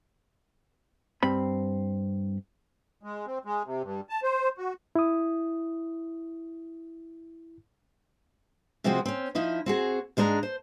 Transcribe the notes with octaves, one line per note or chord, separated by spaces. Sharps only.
G2 C4 B5
G#3
C4
G#3
C3
G2
A5
C5
F#4
E4 D#6
C3 F3 G#3 C4 F#4 G#4
C4 C#4
F3 D#4 E4 D#5
C4 F#4 G#4
G#2 G#3 D4 B4 A#5
C5